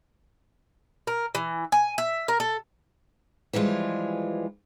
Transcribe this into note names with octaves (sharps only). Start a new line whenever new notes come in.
A#4
E3
G#5
E5
A#4
A4
E3 F3 G3 G#3 F4